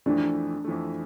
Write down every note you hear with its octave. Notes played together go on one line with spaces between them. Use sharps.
F2 E3 A3 D4
F2 E3 A3